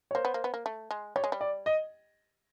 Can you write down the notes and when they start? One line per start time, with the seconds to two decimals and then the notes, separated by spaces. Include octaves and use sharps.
0.11 C#5
0.15 A#3 C5
0.25 B3
0.34 A#3
0.44 B3
0.54 A#3
0.66 A3
0.91 G#3
1.16 G3 C#5
1.24 G#3
1.32 G3
1.41 D5
1.66 D#5